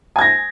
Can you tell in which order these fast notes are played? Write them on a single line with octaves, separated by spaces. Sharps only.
G#5 G#6 A#6